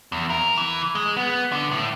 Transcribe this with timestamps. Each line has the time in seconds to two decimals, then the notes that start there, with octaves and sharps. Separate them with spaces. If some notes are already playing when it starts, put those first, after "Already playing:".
0.12 E2
0.30 A#4
0.57 E3
0.95 G#3
1.16 B3
1.52 D3
1.71 A2